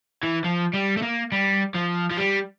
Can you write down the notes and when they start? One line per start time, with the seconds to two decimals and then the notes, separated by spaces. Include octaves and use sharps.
0.23 E3
0.45 F3
0.74 G3
0.97 A3
1.03 A#3
1.32 G3
1.74 F3
2.11 F3
2.17 G3